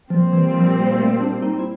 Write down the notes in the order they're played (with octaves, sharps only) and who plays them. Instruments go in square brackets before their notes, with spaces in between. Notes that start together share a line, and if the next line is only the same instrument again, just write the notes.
[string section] A#2 G3 C4 [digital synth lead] F3
[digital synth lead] E3
F3
A3
D4
D#4
E4